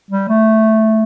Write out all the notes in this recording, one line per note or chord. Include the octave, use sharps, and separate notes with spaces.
G3
A3